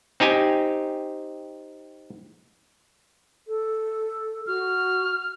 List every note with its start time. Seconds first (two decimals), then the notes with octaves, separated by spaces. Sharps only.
0.20 C4 D#4 G4 G#5
3.48 A4
4.47 F#4 F6